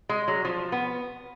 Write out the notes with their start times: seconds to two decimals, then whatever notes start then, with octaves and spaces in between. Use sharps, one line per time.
0.09 G#3
0.28 F#3
0.45 F3
0.72 B3